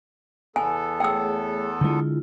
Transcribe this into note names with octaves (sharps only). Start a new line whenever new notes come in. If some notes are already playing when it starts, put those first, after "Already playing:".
E2 B3 A4 G#5
A3 G#4 C#5 G5 E6
D3 G#3 E4 F4